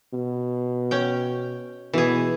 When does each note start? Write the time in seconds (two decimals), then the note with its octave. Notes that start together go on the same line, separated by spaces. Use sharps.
0.13 B2
0.91 C#4 G5
1.93 B2 E3 G#4